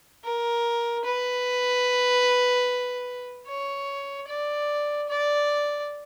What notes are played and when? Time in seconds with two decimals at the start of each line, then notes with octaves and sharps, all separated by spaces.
0.24 A#4
1.04 B4
3.47 C#5
4.28 D5
5.09 D5